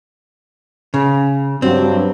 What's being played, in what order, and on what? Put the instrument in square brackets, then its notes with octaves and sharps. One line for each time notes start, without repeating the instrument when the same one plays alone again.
[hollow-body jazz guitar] C#3
[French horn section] G2 F#3 [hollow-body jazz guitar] C4